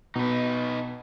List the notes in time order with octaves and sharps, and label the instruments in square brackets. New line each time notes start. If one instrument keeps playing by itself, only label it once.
[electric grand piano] B2 [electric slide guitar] D#4 B4